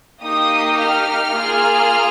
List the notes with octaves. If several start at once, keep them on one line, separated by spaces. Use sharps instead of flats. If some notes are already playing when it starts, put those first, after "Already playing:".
A#3 D#4 G4 D#6
F6
A#3 F4 G#4